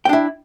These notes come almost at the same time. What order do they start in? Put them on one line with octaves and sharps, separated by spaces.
G5 D4 E4